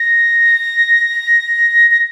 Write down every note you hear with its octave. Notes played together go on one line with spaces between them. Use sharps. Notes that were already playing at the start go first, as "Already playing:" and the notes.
Already playing: A#6
A#6